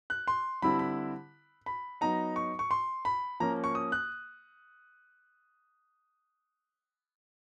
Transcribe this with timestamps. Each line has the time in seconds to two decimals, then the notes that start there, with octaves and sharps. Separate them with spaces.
0.10 F#6
0.28 C6
0.62 D3 G3 C4 E4 B5
0.79 B5
1.66 B5
2.01 F#3 B3 D#4 A#5
2.36 C#6
2.59 C#6
2.71 C6
3.05 B5
3.40 F3 A#3 C#4 A#5
3.64 C#6
3.75 D#6
3.92 F#6